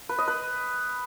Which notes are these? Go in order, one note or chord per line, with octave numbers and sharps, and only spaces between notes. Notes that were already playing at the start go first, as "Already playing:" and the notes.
B4
D#5
B4